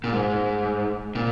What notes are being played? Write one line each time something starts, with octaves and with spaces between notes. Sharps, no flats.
A#2
G#2
A#2